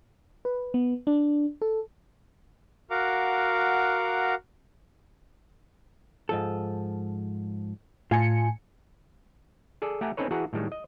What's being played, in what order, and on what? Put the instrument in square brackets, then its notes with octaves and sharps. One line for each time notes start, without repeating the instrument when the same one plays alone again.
[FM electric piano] B4
B3
D4
A4
[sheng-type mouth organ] F#4 A#4 F5 F#5 A#5 D6
[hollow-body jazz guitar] G#2 F3 A4
[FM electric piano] A2 G#5 C#7 [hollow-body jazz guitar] F4 F5
[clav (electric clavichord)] G#4 A4 D5
A3 G4 F#5 G#5 A#5
C4 C#4 D#4 A4 B4 C#5
E3 F#4 G#4 F#5 A5 A#5
A2 D#3 G3 G#3
D#5